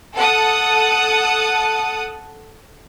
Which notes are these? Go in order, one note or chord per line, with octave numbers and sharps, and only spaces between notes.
A4 F#5 A5 D#6